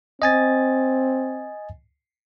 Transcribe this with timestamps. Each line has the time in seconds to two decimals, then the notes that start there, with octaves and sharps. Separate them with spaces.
0.22 C4 D#5 G#5 A6